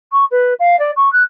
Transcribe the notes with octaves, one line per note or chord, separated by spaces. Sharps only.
C#6
B4
F5
D5
C#6
F#6